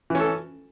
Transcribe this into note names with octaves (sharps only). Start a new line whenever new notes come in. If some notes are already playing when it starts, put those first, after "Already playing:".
E3 C#4 A4